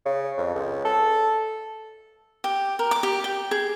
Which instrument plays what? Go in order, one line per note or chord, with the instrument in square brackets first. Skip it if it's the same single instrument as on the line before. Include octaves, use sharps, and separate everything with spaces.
[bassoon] C#3
F2
C#2
A4
[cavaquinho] G4
A#4
D6
G4
G5
G#4